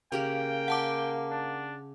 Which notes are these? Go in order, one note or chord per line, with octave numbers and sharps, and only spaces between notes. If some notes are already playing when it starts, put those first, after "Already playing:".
C#3 A#3 G4 A#4 G5
F#5 A5 D6
D4